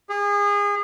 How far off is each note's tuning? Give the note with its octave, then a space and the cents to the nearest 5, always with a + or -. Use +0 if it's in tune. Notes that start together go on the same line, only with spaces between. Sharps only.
G#4 -30